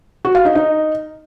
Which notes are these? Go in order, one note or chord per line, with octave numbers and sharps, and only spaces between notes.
F#4
F5
D#4
D#4